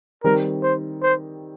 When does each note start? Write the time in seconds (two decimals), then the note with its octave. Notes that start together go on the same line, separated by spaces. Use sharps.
0.24 D#3 G3 C4 D#4 A#4
0.63 C5
1.02 C5